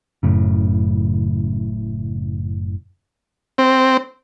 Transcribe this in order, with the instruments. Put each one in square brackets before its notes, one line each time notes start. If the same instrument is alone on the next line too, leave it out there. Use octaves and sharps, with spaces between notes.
[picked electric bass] F#1 F#2 A2 C#3
[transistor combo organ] C4